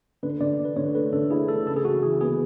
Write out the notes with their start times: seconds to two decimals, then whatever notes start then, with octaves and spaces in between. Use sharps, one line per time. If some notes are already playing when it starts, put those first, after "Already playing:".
0.23 D3 B4
0.40 D3 D5
0.59 D3
0.65 B4
0.76 D3 C#5
0.94 A3 B4
1.12 D3 A4
1.31 E4 G#4
1.48 A3 A4
1.66 C#3 A4
1.76 G#4
1.85 C#3 F#4
2.03 E3 G#4
2.21 B3 G#4